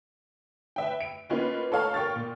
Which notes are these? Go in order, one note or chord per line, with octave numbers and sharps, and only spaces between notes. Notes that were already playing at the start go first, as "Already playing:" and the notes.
B4 E5 G5
D7
A#3 B3 C#4 D#4 F4 B4
A4 C#5 F5 A5 A#5
A#4 G5 C#6 F6 A6
A#2